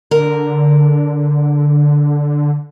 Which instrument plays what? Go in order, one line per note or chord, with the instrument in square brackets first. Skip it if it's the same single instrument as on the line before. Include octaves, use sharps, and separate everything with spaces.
[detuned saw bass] D3 [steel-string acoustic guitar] A#4